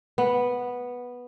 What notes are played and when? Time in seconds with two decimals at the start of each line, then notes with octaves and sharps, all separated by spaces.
0.18 B3